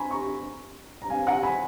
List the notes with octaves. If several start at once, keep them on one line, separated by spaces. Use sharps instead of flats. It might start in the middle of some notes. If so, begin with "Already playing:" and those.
Already playing: G#5 A#5 B5 C#6
A#5 C#6
A#5
F5 G#5
F#5 A#5
G#5 B5